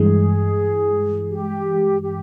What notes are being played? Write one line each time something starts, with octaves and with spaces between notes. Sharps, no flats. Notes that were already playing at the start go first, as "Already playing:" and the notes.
Already playing: G2 E3 G#3 G#4
G4
G4